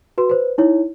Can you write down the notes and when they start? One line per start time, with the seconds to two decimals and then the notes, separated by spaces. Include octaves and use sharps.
0.18 F#4 B4 C6
0.29 B4 C5
0.58 D#4 E4 C#5